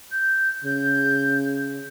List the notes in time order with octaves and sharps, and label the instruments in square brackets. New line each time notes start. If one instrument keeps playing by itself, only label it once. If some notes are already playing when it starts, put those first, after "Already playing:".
[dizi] G6
[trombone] C#3 [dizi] G6